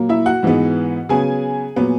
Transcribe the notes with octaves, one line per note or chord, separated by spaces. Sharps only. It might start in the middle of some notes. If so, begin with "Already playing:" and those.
Already playing: A#2 F#3 A#3
E4 E5
F#4 F#5
G#2 E3 G#3 B3
C#3 F#3 B3 G#4 G#5
A#2 F#3 B3